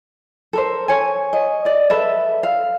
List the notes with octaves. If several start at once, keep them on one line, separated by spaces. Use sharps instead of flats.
A4 A#4 C5
C#5 G#5
D#5
D5 D#5
A4 B4 E5
F5